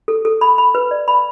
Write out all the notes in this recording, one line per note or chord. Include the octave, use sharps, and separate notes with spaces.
A4
A4
B5
B5
B4
D5
B5